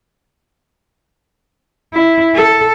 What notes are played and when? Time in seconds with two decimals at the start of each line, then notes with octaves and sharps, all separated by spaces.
1.94 E4
2.35 A4